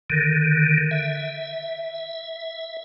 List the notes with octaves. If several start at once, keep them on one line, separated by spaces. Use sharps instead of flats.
D3 D#3
E5